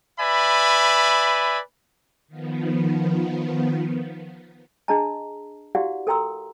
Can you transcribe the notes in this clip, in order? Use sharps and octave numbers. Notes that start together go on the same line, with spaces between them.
B4 D5 E5 G#5 B5
D#3 F3 B3
D4 G#4 D#5 A5 A#5
E4 F#4 G4 D5 F5 F#5
A4 A#4 G5 A#5 C6 E6